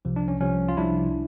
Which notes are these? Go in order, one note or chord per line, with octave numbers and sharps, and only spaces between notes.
C2 C3 F3
D4
C#4
C2 C3 F3 C#4
F4
C2 C3 F3 D4 E4